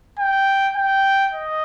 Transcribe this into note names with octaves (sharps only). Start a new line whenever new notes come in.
G5
G5
D#5